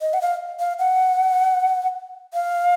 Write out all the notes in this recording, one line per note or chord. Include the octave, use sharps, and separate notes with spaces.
D#5
F#5
F5
F5
F#5
F5